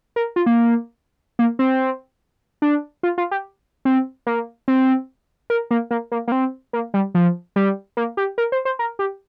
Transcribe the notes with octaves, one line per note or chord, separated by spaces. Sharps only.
A#4
F4
A#3
A#3
C4
D4
F4
F4
G4
C4
A#3
C4
A#4
A#3
A#3
A#3
A#3
C4
A#3
G3
F3
G3
A#3
G4
A#4
C5
C5
A#4
G4